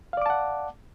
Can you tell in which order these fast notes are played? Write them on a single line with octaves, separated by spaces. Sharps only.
F5 D5 D6 A5 F#5